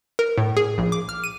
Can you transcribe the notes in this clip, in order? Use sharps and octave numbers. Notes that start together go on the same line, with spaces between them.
A#4
A2
G#4
A#1
D6
F6
D#7